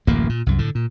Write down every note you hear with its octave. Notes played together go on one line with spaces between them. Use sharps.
D1 A1 F#2 A#3
A#2
C2 F#2
A2 D3
A#2